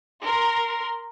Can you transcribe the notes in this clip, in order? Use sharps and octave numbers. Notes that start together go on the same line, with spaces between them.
A#4 C6